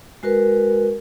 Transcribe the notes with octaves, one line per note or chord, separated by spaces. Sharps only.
G#3 F#4 A#4 B4